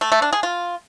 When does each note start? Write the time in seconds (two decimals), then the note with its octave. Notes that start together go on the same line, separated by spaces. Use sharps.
0.01 A3
0.12 A3
0.22 D4
0.33 G#4
0.43 F4